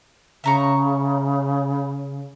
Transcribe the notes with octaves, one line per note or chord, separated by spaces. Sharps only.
C#3 E5 A#5 C#6